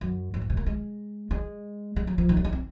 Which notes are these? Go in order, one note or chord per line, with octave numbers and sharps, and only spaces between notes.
F#2
F#2
G#2
C3
A#3
G#3
G#3
G#3
F#3
F3
D#3
F#3
G#3
C4